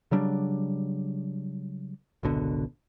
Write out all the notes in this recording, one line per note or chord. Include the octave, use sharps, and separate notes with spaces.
C#3 F#3 G3 D4
G#1 C#2 B2 D3